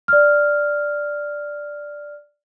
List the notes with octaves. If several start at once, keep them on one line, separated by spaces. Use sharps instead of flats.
D5 F6